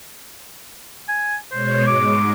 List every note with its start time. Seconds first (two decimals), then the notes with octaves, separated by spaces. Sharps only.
1.08 G#5
1.51 B2 G#3 C5 C#5
1.87 G#2 G#3 D6